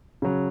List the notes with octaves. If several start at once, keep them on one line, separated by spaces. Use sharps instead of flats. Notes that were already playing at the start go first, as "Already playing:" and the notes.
C#3 F#3